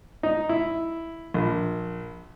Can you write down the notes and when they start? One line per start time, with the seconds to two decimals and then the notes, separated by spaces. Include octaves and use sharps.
0.23 D#4
0.49 E4
1.34 A#1